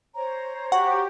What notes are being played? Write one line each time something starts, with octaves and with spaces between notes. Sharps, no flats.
C5 C#5 A#5
F#4 G4 F#5